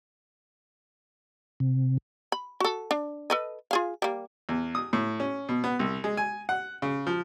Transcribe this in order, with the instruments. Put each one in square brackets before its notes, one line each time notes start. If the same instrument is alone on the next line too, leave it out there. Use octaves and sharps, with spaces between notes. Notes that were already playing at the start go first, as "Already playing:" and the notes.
[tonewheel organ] C3
[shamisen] B5
F#4 A4
D4
A4 B4 D#5
F4 G#4 F5
G3 A#3
[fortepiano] E2
D#6
A2
C#4
B2
B3
C2
G#3
G#5
F#5
C#3
F3